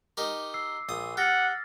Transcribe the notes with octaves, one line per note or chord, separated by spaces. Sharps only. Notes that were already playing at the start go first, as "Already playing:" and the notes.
D#4 G4 A#4 D6
E6 C7
A#1 D#6
G4 F#5 F6 A6 A#6